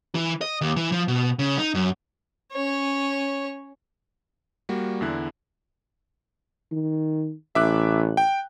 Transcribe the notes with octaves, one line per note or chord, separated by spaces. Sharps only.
E3
D#5
D#2
E3
F3
B2
C#3
D#4
F#2
C#4 C#5
G3 A#3 F#4
E2 D3 E4 F#6
D#3
A1 E5 D6 F#6
G5